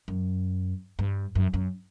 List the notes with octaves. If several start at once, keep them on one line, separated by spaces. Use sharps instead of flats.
F#2
G2
F#2
F#2